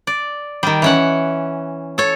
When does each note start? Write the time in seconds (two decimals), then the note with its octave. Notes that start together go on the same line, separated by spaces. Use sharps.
0.07 D5
0.63 D#3 G3
0.82 E3 C#4 F#5
1.98 A4 C#5